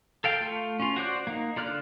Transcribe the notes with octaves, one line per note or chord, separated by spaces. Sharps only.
A4 F5 G5
A3 F4
C#4 F4
F#4 C5 D5 F#6
A#3 D#4
D3 F4 D5 F6 F#6